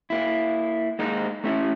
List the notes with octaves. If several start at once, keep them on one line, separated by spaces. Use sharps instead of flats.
A#3 E4
G#3 A#3 D#4
A3 C#4 E4